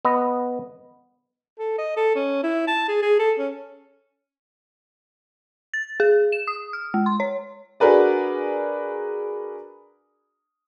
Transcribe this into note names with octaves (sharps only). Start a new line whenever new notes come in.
B3 D#5
A4
D#5
A4
C#4
E4
A5
G#4
G#4
A4
C#4
A6
G#4
E7
D#6
F6
G#3
C6
C#5
D4 F#4 G#4 A#4 B4 D5